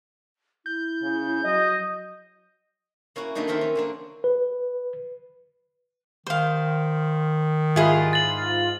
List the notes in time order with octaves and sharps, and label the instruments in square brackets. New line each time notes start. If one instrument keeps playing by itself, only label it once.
[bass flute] E4 [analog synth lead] G6
[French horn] C#3
[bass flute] F#3 [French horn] D#5
[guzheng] A#3 C#4 E4 F#4
D3 F#3 A3 A#3 D4 D#4
D#3 C4 A#4 E5 C6
C#4
D3 A#3 D4
[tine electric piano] B4
[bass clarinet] D#3 [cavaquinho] C5 F5
[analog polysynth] G#2 F4 [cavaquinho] E4 G#4 B4
[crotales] A6 F#7